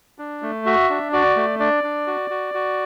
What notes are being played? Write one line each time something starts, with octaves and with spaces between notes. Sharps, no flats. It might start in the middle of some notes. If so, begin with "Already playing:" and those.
D4
A3
F#4 E5
D4
F#4 D5
A3
D4 D5
D4
F#4
F#4
F#4